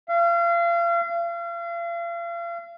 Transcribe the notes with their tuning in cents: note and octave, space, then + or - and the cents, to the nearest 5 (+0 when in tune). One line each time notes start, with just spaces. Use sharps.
F5 -35
F5 -40